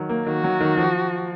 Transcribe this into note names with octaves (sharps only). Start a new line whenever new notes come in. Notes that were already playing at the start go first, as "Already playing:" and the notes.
Already playing: D#3 F#3
A#3
D#3 F#4
F#3
D#3
F3